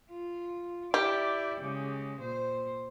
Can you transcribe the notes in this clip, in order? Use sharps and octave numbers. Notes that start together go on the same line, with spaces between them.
F4
E4 G4 D5
C#3 G#3
A#2 C5